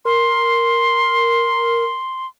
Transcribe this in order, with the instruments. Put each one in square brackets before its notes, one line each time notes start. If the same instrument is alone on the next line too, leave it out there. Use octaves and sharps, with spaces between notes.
[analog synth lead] A#4 [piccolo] C6